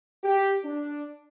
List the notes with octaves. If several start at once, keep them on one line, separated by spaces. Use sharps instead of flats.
G4
D4